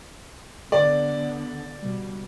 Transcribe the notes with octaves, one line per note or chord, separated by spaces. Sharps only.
D3 B3 D5
B2 G3